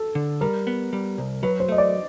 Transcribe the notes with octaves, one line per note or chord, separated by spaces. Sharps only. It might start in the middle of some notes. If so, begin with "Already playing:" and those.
Already playing: A4
D3
G3 A#4
B3
G3
C2
F#3 B4
C5
A3 D#5
D5